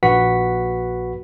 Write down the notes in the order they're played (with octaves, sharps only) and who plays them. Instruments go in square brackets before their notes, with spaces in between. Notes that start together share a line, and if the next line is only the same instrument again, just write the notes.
[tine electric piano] A#1 F#4 B4 F#5 B6